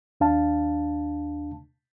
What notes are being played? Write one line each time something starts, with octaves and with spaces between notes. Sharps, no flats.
D#2 D4 F5 A5